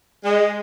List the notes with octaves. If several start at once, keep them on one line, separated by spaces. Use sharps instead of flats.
G#3